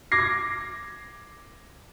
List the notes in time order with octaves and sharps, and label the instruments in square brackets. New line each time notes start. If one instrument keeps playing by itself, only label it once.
[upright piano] D6 G#6 A#6 C7